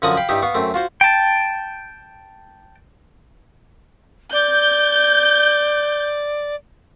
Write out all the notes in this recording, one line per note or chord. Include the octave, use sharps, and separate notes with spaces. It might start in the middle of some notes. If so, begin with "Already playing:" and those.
F#2 D3 F3 F#5 A#5 D#6
F5 G5 B5
G2 G3 D#4 E4 G4
B3 F5 C#6
F#2 A3 C4
F4 F#4 C5
G5 A5
D5 G6